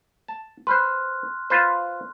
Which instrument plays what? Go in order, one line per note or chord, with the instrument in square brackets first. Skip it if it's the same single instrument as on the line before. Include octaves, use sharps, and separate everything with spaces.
[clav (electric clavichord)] A5
[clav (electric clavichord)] B4 C5 [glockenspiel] C6 F6 F#6
[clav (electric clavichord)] F4 B4 C5